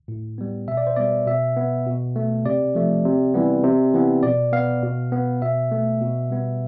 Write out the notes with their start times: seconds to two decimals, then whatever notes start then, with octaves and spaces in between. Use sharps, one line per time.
0.08 A2
0.38 G3 B3
0.68 B2 E5
0.77 D5
0.87 C5
0.96 G3 B3 D5
1.27 B2 E5
1.57 B3
1.86 B2
2.16 A3
2.45 C3 D5
2.75 F3 A3
3.05 C3
3.34 E3 G3 B3
3.64 C3
3.94 E3 B3
4.23 B2 D5
4.53 B3 F5
4.83 B2
5.12 B3
5.42 B2 E5
5.72 A3
6.01 B2
6.30 G3 B3